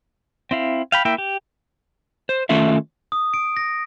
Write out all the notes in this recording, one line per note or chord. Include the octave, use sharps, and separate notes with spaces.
C4 E4 F5
F5 G5 B5
A#3 E4 E5 G5
G4
C5
D#3 A3 C#4 F4 A4 E5
D#6
D7
A#6